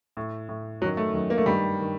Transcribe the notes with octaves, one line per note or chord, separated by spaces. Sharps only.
A2
A2
F#2 D#3 F#3
A3
F#2 D#3
A#3
A3
G2 D#3 G3
D#3